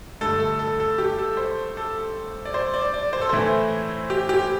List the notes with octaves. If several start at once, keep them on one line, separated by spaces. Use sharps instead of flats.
G2 D3 A3 A4
A4
A4
A4
G4
A4
C5
A4
D5
C5
D5
D5
C5
A4
A2 E3 A3 C4 E4 C5
G4
G4